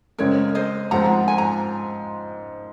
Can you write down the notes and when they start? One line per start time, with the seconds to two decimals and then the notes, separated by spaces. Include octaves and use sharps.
0.18 F#2 C#3 G#3 C4 A#4 C#5
0.55 C5 D#5
0.91 G#2 F3 G#3 C4 F4 F#5 A#5
1.28 G#5
1.38 A#5